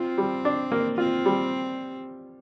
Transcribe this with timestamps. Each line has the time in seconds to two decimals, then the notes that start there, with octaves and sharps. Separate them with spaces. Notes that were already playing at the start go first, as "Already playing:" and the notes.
Already playing: C4 F4
0.18 G3
0.45 D4
0.72 A#3
0.98 C4 F4
1.26 G3